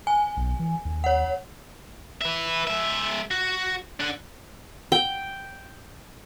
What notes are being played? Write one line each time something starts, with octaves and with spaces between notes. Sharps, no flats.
G#5
B1
E3
D#2
C#5 F#5
B4 E5
G#3 E5
F#4
D4 F#5
G5